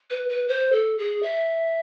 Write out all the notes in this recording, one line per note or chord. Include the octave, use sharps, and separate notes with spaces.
B4
B4
C5
A4
G#4
E5